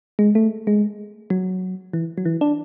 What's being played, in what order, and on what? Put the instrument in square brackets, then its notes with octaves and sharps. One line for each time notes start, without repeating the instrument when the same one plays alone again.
[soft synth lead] G#3
A3
G#3
F#3
E3
F#3
E3
D4